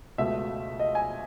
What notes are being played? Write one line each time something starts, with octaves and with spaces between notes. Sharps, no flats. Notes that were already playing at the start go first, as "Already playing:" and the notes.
C#2 B2 A3 E5
D#5
G#5